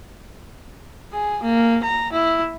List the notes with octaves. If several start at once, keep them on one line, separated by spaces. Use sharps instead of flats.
G#4
A#3
A#5
E4